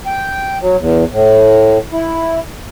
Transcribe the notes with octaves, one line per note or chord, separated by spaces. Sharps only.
G5
F#3
E2
A2
E4